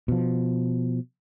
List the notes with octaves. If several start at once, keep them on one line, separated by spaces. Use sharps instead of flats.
B2 F3